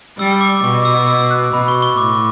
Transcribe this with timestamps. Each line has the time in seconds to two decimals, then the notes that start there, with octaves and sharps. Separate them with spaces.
0.18 G3 E6
0.41 D6
0.64 B2 C#6
0.82 D6
0.85 E6
1.07 E6
1.31 F#6
1.53 B2 B5
1.68 C#6
1.82 C#6
1.97 A2 D6